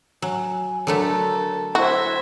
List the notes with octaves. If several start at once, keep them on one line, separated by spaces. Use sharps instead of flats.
F#3 G#5
D3 F#3 A3 A4 A#4
E4 F#4 C5 E5